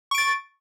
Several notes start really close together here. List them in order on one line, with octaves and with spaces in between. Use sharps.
C#6 D7 A6